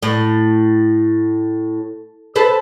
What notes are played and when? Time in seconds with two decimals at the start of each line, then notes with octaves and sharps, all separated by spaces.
0.03 A2
2.36 A4 B4 C5